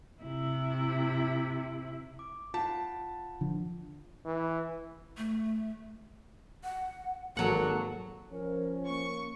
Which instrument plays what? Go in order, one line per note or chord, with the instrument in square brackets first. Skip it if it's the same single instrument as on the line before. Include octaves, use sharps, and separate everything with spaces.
[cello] C3 E4
[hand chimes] D6
[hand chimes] F4 F#5 [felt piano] A5
[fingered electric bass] D3 F3
[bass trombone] E3
[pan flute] A3
[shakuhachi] F#5
[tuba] G#1 [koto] F#3 F#5 [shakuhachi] A#3 [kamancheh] F#4 A4
[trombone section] F3 C#4 [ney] A#4
[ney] A#3 [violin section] C#6